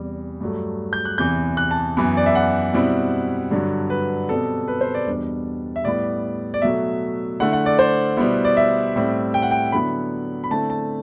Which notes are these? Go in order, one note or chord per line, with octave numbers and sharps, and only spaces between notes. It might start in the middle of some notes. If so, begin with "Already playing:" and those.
Already playing: E2 C3 G3
G2 F#3 A3
G6
F#6
E2 C3 E3 G6
F#6
A5
F#2 E3 B3
D5
E5
F#5
B2 G3 C4 E4
G2 D3 F#3
B4
B2 G3 C4 A4
B4
C5
D5
E2 B2 G3 D4
E5
A2 G3 B3 E4 D5
D5
B2 F#3 A3 E5
D3 A3 E4 F#5
F#5
D5
C5
B2 G3 B3 E4
D5
E5
A2 G3 C4 E4
G5
F#5
G5
D3 F#3 B3 E4 B5
B5
D3 A3 C4 E4 A5
A5